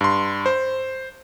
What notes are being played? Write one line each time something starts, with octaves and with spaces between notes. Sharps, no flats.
G2 C6
C5